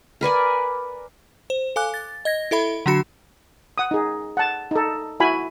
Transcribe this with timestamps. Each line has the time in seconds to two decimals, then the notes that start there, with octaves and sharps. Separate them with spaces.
0.21 A#4 B4 D5 G#5
1.50 C5
1.76 A4 F5 G#5 D6 F#6
1.94 A6
2.25 D#5 G#6 A#6
2.51 E4 A4 E5 B5
2.86 D3 F#3 D4 F#4 B5 C#7
3.78 F#5 D#6
3.91 D#4 G#4
4.37 F#5 A5
4.71 D#4 A4
5.20 E4 F#4 G#5 B5